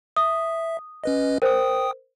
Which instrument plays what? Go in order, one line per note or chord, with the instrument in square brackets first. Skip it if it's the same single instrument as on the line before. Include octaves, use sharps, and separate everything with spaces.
[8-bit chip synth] E5 [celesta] D#6
[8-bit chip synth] C#4 B4 D#5
[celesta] A#4 C5 [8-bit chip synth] G5 D#6